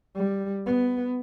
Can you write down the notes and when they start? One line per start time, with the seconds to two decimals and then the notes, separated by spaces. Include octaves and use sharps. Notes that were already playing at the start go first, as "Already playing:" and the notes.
0.16 G3
0.66 B3